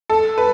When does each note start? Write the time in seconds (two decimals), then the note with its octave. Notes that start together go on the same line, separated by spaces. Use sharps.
0.10 A4
0.38 B4